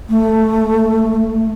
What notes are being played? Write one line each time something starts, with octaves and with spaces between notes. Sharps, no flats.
A3